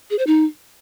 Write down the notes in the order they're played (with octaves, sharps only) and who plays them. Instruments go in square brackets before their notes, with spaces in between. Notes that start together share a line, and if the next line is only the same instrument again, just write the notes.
[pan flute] G#4
C5
D#4